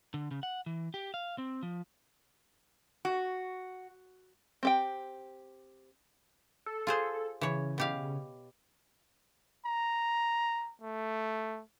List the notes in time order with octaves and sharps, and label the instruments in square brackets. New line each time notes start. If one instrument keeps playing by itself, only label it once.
[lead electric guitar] D3
C#3
F#5
E3
G4
F5
C4
F3
[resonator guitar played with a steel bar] F#4
[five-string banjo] C4 G4 G5
[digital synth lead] A4
[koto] F4 G#4 C5
[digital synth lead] C#3 [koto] E3 C#5
[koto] B2 G4 F5
[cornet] A#5
A3